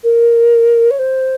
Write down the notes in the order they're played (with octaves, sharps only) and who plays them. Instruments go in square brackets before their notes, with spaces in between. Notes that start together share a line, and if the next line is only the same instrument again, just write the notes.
[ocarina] A#4
C#5
C5